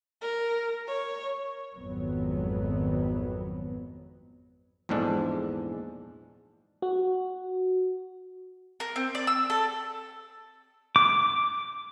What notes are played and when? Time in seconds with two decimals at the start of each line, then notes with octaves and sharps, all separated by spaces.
0.21 A#4
0.87 C#5
1.76 G#1 F2 F#3 B3
4.89 A#1 E2 G#2 G#3 D4 A4
6.82 F#4
8.80 A#4
8.96 C4
9.15 D5
9.27 E6
9.50 A4
10.96 D6